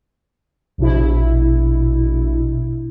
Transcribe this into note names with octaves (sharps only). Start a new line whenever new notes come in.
A#1 B2 E4